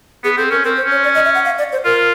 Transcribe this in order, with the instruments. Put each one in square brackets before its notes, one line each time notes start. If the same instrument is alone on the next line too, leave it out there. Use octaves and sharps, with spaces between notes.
[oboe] B3 [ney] G#4
[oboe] C4 [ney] A4
[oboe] C#4 [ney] A#4
[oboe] C4 [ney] A#4
[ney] C5
[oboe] C#4
[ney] C#5
D5
D#5
E5
F#5
F5
D5
C5
[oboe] F4 [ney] A#4